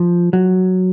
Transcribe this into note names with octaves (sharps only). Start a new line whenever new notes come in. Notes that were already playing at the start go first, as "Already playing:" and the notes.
Already playing: F3
F#3